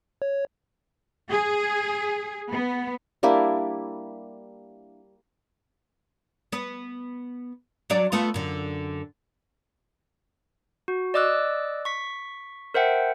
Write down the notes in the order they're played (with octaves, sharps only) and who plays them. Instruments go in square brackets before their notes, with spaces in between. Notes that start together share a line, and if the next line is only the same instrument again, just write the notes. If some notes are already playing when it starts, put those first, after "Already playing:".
[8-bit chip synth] C#5
[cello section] G#4
B3
[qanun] G3 A#3 D4 E4
[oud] B3 B4
F#3 D4 D5
A3 B3 F4
F#2 D3
[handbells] F#4
D5 D#5 D6 E6 F#6
C#6 B6
A#4 C5 E5 F#5 G5